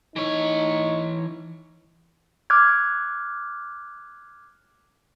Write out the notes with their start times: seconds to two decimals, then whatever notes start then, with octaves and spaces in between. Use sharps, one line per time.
0.16 E3 D#4 C#5
2.50 D6 F6 F#6 G#6